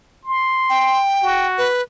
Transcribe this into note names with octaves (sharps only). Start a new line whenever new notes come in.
C6
G5
F#4
B4